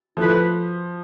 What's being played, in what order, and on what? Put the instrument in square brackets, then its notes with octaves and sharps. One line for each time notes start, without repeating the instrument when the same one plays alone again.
[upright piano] F3 [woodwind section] A3 E4 B4